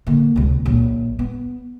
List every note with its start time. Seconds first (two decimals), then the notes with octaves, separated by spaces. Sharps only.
0.07 D3 A#3
0.36 C#2 C3
0.66 A#1 F#3
1.19 B3